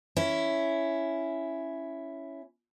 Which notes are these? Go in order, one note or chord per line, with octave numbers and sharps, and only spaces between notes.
C#4 E4